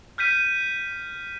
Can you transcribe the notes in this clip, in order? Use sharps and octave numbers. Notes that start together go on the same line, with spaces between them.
F6 G6 B6 D#7